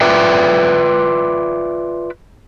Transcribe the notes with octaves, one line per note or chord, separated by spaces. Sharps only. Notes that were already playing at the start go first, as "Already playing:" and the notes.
F4 B4 D5 E5 G5